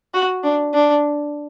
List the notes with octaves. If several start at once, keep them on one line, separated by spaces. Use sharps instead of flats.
F#4
D4
D4